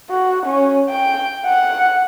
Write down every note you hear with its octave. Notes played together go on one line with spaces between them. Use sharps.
F#4
C#4
G5
F#5